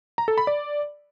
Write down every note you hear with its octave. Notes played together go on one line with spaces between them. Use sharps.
A#5
A4
B5
D5